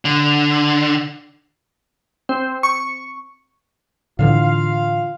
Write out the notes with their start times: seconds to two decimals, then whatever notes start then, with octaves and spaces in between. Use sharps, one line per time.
0.05 D3
2.29 C4
2.63 C#6
4.19 A2 D3 E3 F4 F5